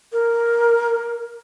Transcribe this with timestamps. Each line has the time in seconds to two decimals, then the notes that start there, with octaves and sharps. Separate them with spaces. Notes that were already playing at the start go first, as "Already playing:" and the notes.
0.12 A#4